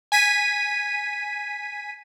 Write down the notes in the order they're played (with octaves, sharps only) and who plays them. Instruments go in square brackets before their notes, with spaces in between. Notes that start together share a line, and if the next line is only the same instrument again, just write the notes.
[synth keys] G#5 B6 D#7